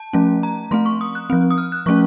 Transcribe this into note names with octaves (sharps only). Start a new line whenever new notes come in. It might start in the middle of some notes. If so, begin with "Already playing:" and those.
Already playing: A5
F3 A3 C#4
A#5
F3 A3 C4 C6
C#6
D#6
F#6
F3 C4
D#6
F6
F#6
F3 A3 C#4 C#6